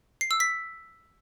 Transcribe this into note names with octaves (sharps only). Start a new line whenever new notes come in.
C7
E6
B6